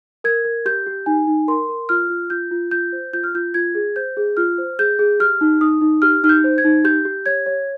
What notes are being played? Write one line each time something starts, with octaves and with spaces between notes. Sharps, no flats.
A#4 G#6
A#4
G4 G6
G4
D#4 G#5
D#4
A#4 C6
A#4
F4 F6
F4
F4 G6
F4
F4 G6
C5
F4 G6
F6
F4 G6
F4 G#6
G#4
C5 G6
G#4
F4 F6
C5
G#4 G6
G#4
G4 F6
D#4
D#4 D#6
D#4
G4 F6
D#4 F6
G6
C5
G#6
D#4
G4 G6
G4
C#5 G#6
C#5